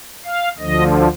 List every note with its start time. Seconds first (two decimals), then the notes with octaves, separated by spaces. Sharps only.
0.24 F5
0.58 D2 D3 F3 D#5